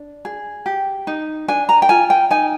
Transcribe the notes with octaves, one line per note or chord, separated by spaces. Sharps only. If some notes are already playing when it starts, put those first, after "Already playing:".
Already playing: D4
G#4
G4
D#4
D4 G#5
A#5
G5
F4 G#5
G5
D#4 G#5